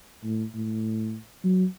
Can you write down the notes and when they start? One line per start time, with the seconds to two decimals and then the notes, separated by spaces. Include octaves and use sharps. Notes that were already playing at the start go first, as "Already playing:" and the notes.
0.23 A2
0.54 A2
1.44 F#3